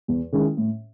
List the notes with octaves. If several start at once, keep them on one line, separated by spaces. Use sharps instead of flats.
E2
D#3 G#3 C#4 E4
A2